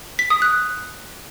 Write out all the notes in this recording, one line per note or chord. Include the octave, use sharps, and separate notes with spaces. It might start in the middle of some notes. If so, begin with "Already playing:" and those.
B6
D#6
F#6